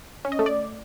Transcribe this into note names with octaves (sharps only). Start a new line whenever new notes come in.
C#4
D#5
A3
D5